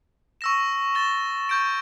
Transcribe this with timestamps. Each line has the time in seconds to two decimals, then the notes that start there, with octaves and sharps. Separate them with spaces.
0.41 C#6 E6 A#6 E7
0.95 A6 E7 G7
1.49 C#6 G6 D7